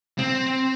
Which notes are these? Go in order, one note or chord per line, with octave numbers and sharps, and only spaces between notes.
C4